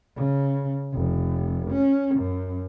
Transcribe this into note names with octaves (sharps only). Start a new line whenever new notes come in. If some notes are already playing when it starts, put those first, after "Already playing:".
C#3
F1
C#4
F#2